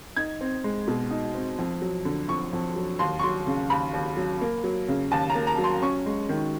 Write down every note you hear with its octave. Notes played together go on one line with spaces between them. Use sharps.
D#4 G#6
C4
G#3
B2
D#4
C4
F2
F#3
D3
F2 C#6
F2
F#3
D#2 C6
C#6
F#3 C6
C#3
D#2 B5
D#2
F#3
A#3
F#3
C#3
D#2 A5
A#5
A#3
A#5
F#3
C6
C#4 C#6
G#3
D#3